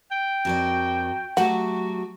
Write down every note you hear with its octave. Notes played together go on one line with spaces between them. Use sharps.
G5
F2 F#4 A#4 D5
F#3 A3 F#4 G4 F#5